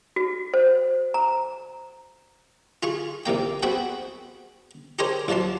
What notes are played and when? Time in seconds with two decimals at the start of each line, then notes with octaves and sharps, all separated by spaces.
0.16 F#4
0.54 C5
1.14 A#5
2.83 F4 G#4 C#6
3.26 A1 C3 A#3 G5
3.63 B3 C4 F#4 G#4 G5
4.99 G4 G#4 A#4 C5 C#5 G#5
5.28 A1 F3 F#3 A5 C6